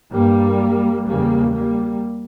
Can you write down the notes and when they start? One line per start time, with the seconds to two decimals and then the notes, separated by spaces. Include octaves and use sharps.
0.12 G2 G3 A#3
1.06 E2 C#3 G3 A#3
1.53 G3 A#3